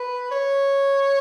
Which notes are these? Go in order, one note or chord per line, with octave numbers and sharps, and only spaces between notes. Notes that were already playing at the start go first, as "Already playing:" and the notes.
Already playing: B4
C#5